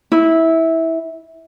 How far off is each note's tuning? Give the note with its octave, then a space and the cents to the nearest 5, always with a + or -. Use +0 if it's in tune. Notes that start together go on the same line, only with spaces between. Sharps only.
E4 -15